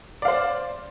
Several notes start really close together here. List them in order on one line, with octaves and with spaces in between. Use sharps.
D5 F5 C5